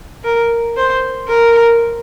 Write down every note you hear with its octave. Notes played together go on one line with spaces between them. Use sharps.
A#4
C5
A#4